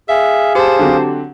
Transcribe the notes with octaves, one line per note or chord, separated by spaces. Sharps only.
G#4 E5 F5
G4 C5 A5
D3 F#3 C4